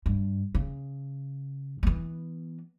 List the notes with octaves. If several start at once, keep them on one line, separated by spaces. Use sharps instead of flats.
G2
C#3
E3 B3